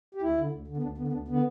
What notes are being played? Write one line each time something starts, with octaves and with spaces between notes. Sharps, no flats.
G4
D2 E4
D3
D2
D3
B3
D2 D4
D3 B3
B3
D2 D4
D3 B3